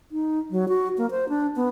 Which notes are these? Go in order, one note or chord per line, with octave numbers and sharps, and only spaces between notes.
D#4
F#3
F#4
A#3
C5
D4
B3